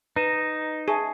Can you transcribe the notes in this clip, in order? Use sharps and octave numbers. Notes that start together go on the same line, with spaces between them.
D#4 B4 D#7 E7
G#4 E5 A5 C#6